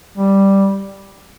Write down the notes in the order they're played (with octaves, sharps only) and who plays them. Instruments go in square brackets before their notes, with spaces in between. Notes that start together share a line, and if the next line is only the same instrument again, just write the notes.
[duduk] G3